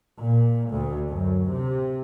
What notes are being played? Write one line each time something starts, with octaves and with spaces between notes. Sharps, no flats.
A#2
D2
F#2
C3